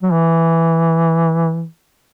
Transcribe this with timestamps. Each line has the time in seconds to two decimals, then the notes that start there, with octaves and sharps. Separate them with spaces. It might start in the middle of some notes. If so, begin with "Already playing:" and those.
0.03 F#3
0.12 E3